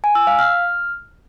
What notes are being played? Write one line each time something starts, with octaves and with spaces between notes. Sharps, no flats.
G#5
E6
F5
F6